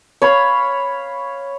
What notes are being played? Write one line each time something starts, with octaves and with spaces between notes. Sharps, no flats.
C#5 F5 B5